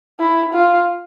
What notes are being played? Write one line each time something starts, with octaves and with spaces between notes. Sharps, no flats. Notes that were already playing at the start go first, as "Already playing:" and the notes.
E4
F4